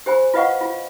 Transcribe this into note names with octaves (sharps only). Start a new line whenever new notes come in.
G4 C5 G#5 B5
F4 B4 D#5 F5 F#5 C#6
F4